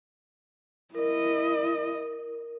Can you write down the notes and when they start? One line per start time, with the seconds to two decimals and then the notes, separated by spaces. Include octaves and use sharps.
0.95 E4 A#4 D#5